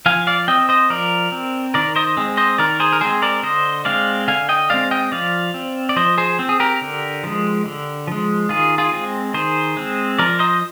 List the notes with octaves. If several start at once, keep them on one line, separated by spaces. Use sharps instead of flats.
F3 F5 G#5
D5 F5
C4 D#5 G5
C5 D#5
F3 A#4 D5
C4
D#3 A#4 D5
C5 D#5
G#3 C4
C5 D#5
D#3 A#4 D5
G#4 C5
A#4
G#3 C4 G#4 C5
A#4 D5
D3 C5 D#5
G#3 C4 D5 F5
D3 F5 G#5
D#5 G5
G#3 C4 D5 F5
D#5 G5
F3 D5 F5
C4
D5
F3 C5 D#5
G#4 C5
C4
G#4
G4 A#4
D3
F3 G#3
D3
F3 G#3
D#3 F4 G#4
F4 G#4
G#3 C4
D#3 G#4 C5
G#3 C4
F3 A#4 D5
C5 D#5